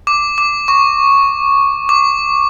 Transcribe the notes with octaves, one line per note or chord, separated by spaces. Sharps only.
D6
D6
C#6
D6